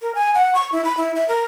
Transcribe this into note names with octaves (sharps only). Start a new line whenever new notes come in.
A#4
G#5
F#5
C#6
E4
B5
E4
E5
A#4